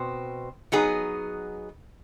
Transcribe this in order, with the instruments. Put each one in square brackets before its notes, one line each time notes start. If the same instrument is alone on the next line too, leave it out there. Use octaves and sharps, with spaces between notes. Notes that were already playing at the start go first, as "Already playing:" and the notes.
Already playing: [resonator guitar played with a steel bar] B2 C4
F#3 B3 D#4 G#4